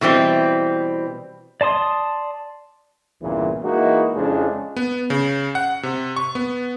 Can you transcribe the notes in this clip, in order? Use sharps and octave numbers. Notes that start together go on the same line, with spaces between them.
B2 E3 G3 C4 E4
D5 A5 C6 D#6
B1 E2 G2 A#2 C#3 E3
E3 G#3 A#3 D#4 E4 F#4
F2 C#3 G#3 C#4 D4 E4
B3
C#3
F#5
C3
C#6
B3